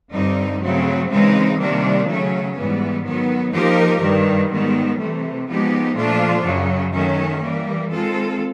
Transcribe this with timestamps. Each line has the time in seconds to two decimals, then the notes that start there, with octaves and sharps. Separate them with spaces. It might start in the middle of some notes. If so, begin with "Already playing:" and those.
0.11 G2 D3 G3 C4 D#4
0.60 C#3 F#3 A3 C4
1.09 C#3 E3 G#3 C4 D#4
1.57 C3 D#3 G3 A#3 D4
2.06 C#3 F#3 A3 C#4
2.54 G#2 E3 G3 B3
3.04 D#3 F#3 B3
3.52 F3 A#3 D#4 G4 A#4
4.01 G2 D#3 G3
4.50 G#2 D#3 G3 B3
4.98 C3 E3 A3
5.47 F3 G#3 B3 D#4 G4
5.95 A#2 F3 A3 D4 F4
6.44 F#2 C#3 F#3
6.92 D#3 F#3 A3 C#4
7.41 E3 G3 A#3
7.90 D#3 G#3 C4 F4 A4